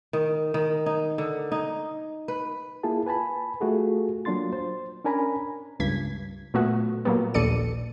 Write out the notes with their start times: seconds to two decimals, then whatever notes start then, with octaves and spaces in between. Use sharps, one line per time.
0.13 D#3
0.54 D#3
0.86 D#4
1.18 D3
1.52 D#4
2.28 B4
2.83 A#3 E4 F4 G#4 A5
3.06 B4 G#5 A5 B5
3.61 A3 F4 F#4 G#4 A4
4.25 F#3 A#3 D4 F4 C6 A6
4.53 C5
5.04 C#4 D4 A#4 G#5 A#5 B5
5.80 C#2 G2 G#6 B6
6.54 A#2 F#3 A3 B3 F#4
7.05 A#2 F#3 G3 B3
7.34 A#1 D#2 A4 D5 C#7 D#7